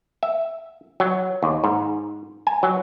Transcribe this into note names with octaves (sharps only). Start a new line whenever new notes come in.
E5
F#3
D#2
G#2
G#5
F#3